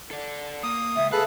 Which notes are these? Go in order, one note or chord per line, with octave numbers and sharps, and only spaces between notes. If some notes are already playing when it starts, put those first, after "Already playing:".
A4 D5
A#3 D#6
C#2 E5
C#3 G#4 A4 B4 F5 F#6